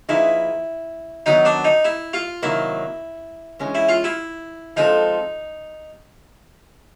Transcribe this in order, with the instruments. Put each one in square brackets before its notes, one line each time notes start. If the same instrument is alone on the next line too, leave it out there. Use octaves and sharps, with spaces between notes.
[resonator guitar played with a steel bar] F3 A#3 D#4 G#4 B4 [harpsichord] E4
[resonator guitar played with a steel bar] D#3 F#3 B3 [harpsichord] D#4
[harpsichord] D4
D#4
E4
F4
[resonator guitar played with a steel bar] C3 D#3 F#3 A#3 [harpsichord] E4
[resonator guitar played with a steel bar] E3 G#3 C#4
[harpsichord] E4
F4
E4
[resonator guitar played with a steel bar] F3 G#3 C4 F4 A4 [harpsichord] D#4